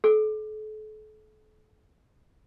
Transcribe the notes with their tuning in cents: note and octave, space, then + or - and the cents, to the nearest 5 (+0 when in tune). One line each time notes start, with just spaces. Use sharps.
A4 -40